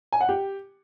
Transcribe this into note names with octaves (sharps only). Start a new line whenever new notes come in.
G#5
F#5
G4